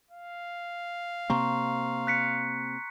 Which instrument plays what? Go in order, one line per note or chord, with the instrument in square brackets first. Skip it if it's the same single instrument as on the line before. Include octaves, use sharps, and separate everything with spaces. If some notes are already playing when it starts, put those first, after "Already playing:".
[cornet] F5
[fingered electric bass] C3 A#3 C4 [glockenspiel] A#5 C6 C#6
[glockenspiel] F#6 B6 C#7